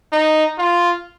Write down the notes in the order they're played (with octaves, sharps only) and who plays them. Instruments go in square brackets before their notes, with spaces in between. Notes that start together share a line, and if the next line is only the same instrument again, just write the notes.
[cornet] D#4
F4